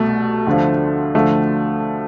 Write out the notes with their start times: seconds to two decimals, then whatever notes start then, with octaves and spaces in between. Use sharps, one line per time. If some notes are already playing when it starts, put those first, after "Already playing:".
Already playing: C2 B2 A3
0.47 D2 D3 F3
1.15 D2 D3 F3 A3